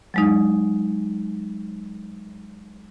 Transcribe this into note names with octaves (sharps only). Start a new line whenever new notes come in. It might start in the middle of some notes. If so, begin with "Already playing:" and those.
F#3 G#3 D#4